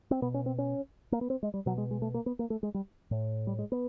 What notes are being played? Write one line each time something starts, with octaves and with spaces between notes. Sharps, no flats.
C4
B2 B3
C#4
C4
C#4
A#3
B3
C4
G#3
G3
B2 F#3
G#3
G#3
A3
A#3
B3
A#3
A3
G#3
G3
A2
G3
G#3
B3